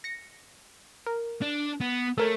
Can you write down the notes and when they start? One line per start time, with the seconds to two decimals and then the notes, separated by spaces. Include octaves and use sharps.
0.04 A#6 C#7
1.07 A#4
1.42 D4
1.81 B3
2.18 A3 A4 A#4 C#5